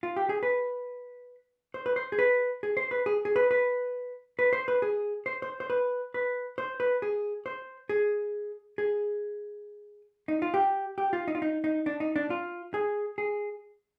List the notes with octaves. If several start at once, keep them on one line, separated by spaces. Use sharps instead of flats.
F4
G4
G#4
B4
C5
B4
C5
G#4
B4
G#4
C5
B4
G#4
G#4
B4
B4
B4
C5
B4
G#4
C5
C5
C5
B4
B4
C5
B4
G#4
C5
G#4
G#4
D#4
F4
G4
G4
F4
D#4
F4
D#4
D#4
D4
D#4
D4
F4
G#4
G#4